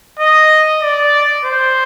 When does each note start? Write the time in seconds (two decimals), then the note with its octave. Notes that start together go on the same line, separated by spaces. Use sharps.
0.19 D#5
0.82 D5
1.45 C5